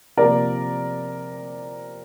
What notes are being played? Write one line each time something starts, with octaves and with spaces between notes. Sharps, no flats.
C3 F3 A#3 A#4 D5